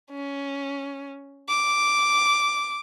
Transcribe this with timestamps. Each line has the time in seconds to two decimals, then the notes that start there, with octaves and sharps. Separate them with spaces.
0.11 C#4
1.48 D6